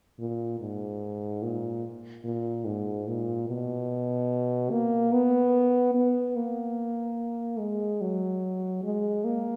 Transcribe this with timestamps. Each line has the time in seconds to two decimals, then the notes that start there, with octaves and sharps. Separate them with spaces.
0.19 A#2
0.60 G#2
1.43 A#2
2.24 A#2
2.65 G#2
3.07 A#2
3.49 B2
4.71 A#3
5.13 B3
5.94 B3
6.36 A#3
7.59 G#3
8.01 F#3
8.83 G#3
9.25 A#3